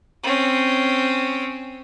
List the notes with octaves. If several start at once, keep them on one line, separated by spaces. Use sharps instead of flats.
C4 C#4